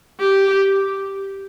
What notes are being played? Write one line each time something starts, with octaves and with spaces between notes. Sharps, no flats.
G4